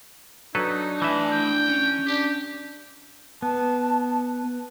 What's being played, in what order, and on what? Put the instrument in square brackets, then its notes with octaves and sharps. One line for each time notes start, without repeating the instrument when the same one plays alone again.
[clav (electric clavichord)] F#3 A4 B4 [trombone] D4 [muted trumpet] D#4
[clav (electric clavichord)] E3 E5 [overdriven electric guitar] A3 G#5
[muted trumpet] G5
[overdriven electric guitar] C#4
[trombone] D4 [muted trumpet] G4
[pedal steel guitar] B3 [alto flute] A5